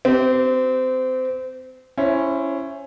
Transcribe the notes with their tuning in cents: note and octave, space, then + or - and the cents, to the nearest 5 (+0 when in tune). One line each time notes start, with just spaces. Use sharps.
C4 -25 G4 -30
C#4 +0 E4 +15 C5 +20